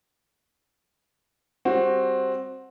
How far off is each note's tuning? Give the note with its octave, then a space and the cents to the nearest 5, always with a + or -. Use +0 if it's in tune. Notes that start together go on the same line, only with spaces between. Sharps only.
G3 +10 C4 +10 F#4 +0